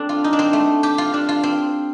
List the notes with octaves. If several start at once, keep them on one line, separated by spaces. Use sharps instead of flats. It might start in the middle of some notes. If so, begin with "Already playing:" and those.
Already playing: A3 C4 D4
F4
D#4
D4
C4
A3
G4
F4
D4
F4
C4